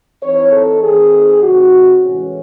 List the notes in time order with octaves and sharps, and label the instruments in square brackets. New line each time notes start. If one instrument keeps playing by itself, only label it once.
[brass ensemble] E3 C4 D#4 C#5
A4
D#3 A3 C4 D#4 G#4
C3 F#3 C4 D#4 F#4
A2 E3 G#3 C#4